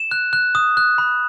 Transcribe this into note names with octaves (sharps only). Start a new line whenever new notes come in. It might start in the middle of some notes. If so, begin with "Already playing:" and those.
Already playing: E7
F#6
F#6
D#6
F#6
B5